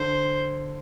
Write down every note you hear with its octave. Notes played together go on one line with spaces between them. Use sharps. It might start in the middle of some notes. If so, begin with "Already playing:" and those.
Already playing: D3 C5